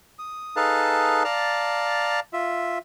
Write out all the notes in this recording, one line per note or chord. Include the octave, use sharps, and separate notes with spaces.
D#6
D#4 G#4 A4 B4 F5 A5
D5 F5 A5 A#5
F4 E5